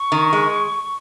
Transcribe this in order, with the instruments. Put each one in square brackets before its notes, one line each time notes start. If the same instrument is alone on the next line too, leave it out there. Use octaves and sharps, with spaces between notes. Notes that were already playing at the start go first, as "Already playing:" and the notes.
Already playing: [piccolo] C#6
[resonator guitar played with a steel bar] D#3
G#3